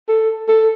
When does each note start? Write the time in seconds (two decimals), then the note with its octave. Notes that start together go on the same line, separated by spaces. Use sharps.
0.09 A4
0.48 A4